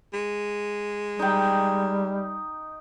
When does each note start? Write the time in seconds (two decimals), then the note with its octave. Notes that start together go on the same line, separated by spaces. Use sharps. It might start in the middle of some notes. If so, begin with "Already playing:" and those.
0.13 G#3
1.19 G3 D#4 G5